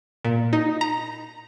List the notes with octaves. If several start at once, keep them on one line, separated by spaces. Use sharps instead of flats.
A#2
D#4
A#5